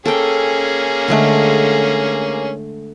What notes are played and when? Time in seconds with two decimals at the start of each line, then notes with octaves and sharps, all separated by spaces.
0.06 A#3 C#4 G#4 A4 G5
1.08 D3 G#3 A3